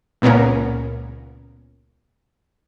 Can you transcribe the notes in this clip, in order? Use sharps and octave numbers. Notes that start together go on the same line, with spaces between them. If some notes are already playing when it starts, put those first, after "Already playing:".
C#2 A#2 B3 C#4 A#4